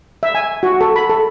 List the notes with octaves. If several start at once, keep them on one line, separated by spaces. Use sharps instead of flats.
E5
G#5
F#4
A4
B5
A4